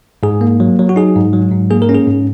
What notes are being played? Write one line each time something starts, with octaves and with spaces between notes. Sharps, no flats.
G#2 G#4
A#3
F#3
F#3
F#4
D#4 G#4
G#2
F#3
G#2
A#3 G#4
A#4
C#4
G#4
G#2